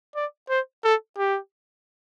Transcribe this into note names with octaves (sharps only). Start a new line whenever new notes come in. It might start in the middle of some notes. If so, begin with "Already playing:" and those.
D5
C5
A4
G4